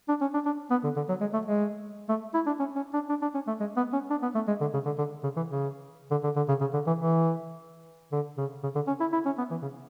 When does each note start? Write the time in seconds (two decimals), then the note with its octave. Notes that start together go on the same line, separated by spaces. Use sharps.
0.08 D4
0.21 C#4
0.34 D4
0.45 D4
0.70 B3
0.84 D3
0.96 D3
1.09 F#3
1.20 G#3
1.33 A3
1.45 G#3
2.09 A3
2.34 E4
2.46 D4
2.59 C#4
2.76 C#4
2.93 D4
3.09 D4
3.22 D4
3.34 C#4
3.47 A3
3.60 G#3
3.76 B3
3.93 C#4
4.10 D4
4.22 B3
4.35 A3
4.47 G#3
4.61 D3
4.73 C#3
4.85 D3
4.98 D3
5.23 C#3
5.36 E3
5.49 C#3
6.11 D3
6.24 D3
6.36 D3
6.48 C#3
6.61 C#3
6.73 D3
6.87 E3
6.99 E3
8.12 D3
8.37 C#3
8.63 C#3
8.75 D3
8.87 C#4
9.00 E4
9.12 E4
9.25 C#4
9.38 B3
9.50 E3
9.62 C#3